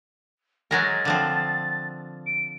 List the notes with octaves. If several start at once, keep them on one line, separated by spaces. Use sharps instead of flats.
F#3 G#3 A#4 A6
D3 F3 C4
D7